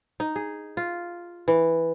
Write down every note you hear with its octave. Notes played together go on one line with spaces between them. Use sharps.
D#4
G#4
F4
E3